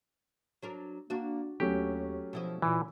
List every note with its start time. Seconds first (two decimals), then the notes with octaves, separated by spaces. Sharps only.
0.63 F#3 D4 A#4
1.10 A#3 D4 F#4
1.60 D#2 F#3 A3 C#4 G4
2.33 B2 F3 E4 D#5
2.62 A#2 E3